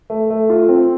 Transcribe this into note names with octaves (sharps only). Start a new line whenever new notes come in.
A3
A3
F4
C4